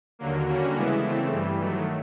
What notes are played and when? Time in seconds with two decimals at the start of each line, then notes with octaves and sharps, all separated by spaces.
0.19 D#2 D3 F#3 A#3
0.47 D3 G3 A#3 C#4 F#4
0.75 C#3 E3 G#3 B3 E4
1.03 C#3 E3 A3 C4
1.31 G2 E3 G3
1.60 D#3 F#3 A3